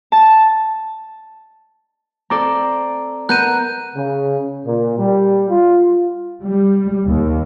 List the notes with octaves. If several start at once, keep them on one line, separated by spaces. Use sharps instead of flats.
A5
C4 A4 D5 A#5 D6
B3 A#4 F#6 G6 D#7
C#3
A#2
G3
F4
G3
D#2